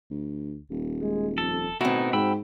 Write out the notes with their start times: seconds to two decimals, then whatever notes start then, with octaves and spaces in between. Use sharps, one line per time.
0.10 D2
0.71 D#1
1.02 G#3
1.38 F2 A4
1.81 B2 A3 C4 D#4 E4 F#4
2.13 G#2 G5 B5 E6